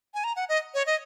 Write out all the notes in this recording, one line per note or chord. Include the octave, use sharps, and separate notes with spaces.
G#5
A#5
F#5
D#5
C#5
D#5